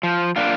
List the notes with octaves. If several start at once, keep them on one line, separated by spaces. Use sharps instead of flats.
F3
A#3 D4 F4